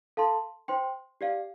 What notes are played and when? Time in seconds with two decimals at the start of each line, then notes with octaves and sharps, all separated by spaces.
0.17 A4 F5 A5 C6
0.68 C5 G5 C6
1.21 G4 D5 F5